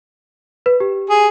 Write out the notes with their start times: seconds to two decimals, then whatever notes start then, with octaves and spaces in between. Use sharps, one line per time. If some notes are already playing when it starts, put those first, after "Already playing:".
0.66 B4
0.80 G4
1.10 G#4